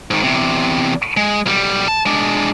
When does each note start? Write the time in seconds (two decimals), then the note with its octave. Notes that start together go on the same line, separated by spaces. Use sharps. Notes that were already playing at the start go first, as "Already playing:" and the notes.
0.11 G#2 D#3
0.23 E2 C3
1.17 G#3
1.46 B1 G3
1.88 A5
2.06 G#3 D4